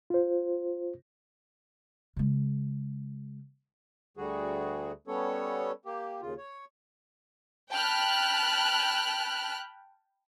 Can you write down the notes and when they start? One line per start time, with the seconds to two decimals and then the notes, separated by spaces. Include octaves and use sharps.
0.10 F4 C5
2.16 C#3 G#3
4.17 D2 D3 G3 F#4 G#4
5.07 G3 B3 C#4 A4 C#5
5.85 A#3 G4
6.22 D#2 C#3 F4
6.38 C#5
7.71 G5 A5 B5 F6 F#6